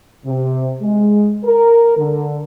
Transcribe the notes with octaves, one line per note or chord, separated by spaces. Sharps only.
C3
G#3
A#4
D3